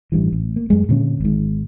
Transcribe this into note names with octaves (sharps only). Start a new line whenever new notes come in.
A1 G2 E3
A1
A#3
F#2 G#3
A#2 D3 C4 C#4
G#1 G#2